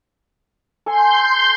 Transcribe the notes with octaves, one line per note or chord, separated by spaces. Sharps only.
A4 G#5 C6 G6